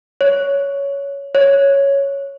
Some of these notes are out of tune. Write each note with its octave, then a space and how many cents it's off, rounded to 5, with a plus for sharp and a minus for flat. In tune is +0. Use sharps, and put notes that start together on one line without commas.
C#5 +10
C#5 +0